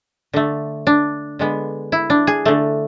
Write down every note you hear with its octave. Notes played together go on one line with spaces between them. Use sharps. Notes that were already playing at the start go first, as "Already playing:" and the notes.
D3 A3
D4
D3 G#3 B3
E4
D4
G#4
D3 A3